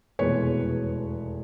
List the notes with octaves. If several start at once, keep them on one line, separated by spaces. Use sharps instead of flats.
F1 E2 B2 G#3 B4 C#5